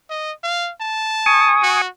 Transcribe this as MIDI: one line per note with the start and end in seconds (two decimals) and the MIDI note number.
0.10 0.32 75
0.44 0.71 77
0.81 1.53 81
1.26 1.81 80
1.26 1.81 85
1.26 1.81 87
1.63 1.88 66